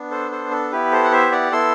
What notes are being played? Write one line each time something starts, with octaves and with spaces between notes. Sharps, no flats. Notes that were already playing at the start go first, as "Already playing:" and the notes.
Already playing: B3 D4
A4 C5
A4 C5
A4
B3 E4 G4 B4
A4 C5
F#5
C5 E5
D5 F#5
B3 E4 A4 C6 E6